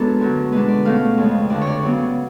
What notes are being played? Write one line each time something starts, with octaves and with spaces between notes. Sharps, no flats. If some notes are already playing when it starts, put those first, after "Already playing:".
Already playing: F#2 G#3 B3 D4 A4 B4
D2 D3 F#3
B2 G#3 D4 B4
D5
B2 A3 C#4 F5
F2 C#3 G#3
D2 D3 F3 D5
C#5
D5
C#3 F#3 B3